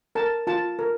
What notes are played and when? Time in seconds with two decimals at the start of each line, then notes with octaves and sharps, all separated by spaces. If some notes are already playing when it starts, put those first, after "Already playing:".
0.15 A#4 A5
0.47 F4 A5
0.79 A#4